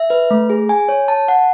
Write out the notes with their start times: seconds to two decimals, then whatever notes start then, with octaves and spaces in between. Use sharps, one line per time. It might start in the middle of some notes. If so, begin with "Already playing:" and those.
Already playing: E5
0.10 B4
0.31 A3
0.50 G#4
0.69 G#5
0.89 C#5
1.08 A5
1.28 F#5